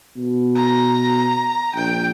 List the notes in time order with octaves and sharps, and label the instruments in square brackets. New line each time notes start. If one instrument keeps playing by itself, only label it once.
[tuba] B2
[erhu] A#5
[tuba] A#1 [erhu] G5